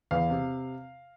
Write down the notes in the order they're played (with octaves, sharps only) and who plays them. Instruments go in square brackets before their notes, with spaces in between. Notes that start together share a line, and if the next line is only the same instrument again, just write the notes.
[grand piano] E2 F5
C3